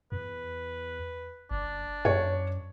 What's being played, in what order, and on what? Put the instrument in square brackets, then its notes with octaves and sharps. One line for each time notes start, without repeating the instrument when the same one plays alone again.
[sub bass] E2 [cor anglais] B4
[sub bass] F#1 [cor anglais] D4
[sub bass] F#2 [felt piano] C#5